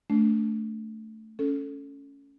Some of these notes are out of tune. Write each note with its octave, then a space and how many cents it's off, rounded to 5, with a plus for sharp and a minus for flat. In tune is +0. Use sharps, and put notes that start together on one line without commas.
A3 +0 D4 -25
C#4 +10 A4 +0